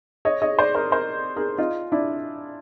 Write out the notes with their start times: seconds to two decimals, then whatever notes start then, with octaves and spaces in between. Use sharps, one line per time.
0.25 C#5 D#5
0.42 C#5 D#5
0.59 C5 D5
0.75 A#4 C5
0.91 A#4 C5
1.36 G#4 A#4
1.58 D#4 F4
1.92 D4 E4